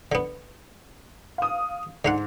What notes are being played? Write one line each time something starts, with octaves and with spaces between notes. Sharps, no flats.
D3 B3
F5 D#6
G#2 D3 F5 F#5